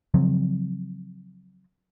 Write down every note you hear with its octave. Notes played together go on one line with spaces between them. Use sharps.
C#3 F3 F#3 C4